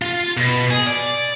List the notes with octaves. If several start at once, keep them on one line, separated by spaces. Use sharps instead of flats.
F4
B2
G#4
D5